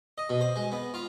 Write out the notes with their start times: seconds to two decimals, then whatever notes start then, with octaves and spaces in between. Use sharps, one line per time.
0.18 D#5
0.30 B2
0.41 C5
0.56 G#3
0.72 B3
0.94 F4